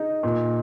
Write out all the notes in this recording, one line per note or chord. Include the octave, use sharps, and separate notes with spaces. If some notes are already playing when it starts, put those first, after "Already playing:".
Already playing: D#4 G#4
A#2